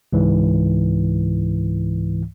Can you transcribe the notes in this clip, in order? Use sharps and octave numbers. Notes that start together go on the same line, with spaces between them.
C#2 G#2 E3